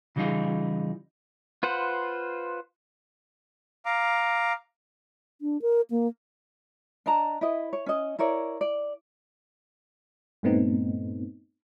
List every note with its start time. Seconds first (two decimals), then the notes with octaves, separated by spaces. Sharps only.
0.16 C#3 E3 G3 D#4 F4 G#4
1.63 F4 B4 C5 F#5
3.85 F5 A#5 D6
5.41 D4
5.62 A#4
5.91 A#3
7.06 D4 D#5 A5 A#5
7.41 E4 B4 D#5
7.73 C#5
7.86 C#4 D#5
8.19 E4 A#4 C#5 D5
8.61 D5
10.43 G2 A#2 A3 B3 C4 D#4